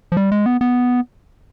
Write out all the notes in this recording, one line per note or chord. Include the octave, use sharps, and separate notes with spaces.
F3
G3
G#3
B3
B3